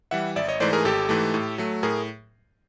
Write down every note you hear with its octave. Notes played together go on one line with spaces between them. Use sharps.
E3 G3 E5 F#5
G#1 D5 E5
C#5 D#5
G#2 E3 A3 C5 D5
G#4 A#4
G#1 G4 A4
G#2 E3 A3
A2
F#3 A3
A2 G#4 A#4